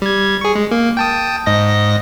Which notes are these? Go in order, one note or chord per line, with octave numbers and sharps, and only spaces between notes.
G3 G#6
G#4 C#6
G#3
A#3
G5 A5 D#6
G#2 D#5 A#6